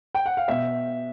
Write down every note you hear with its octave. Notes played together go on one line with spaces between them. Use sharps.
G5
F#5
F5
B2 E5